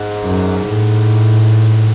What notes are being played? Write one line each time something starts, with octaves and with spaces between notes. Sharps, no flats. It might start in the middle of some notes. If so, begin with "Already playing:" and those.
Already playing: G#2
F#2
A2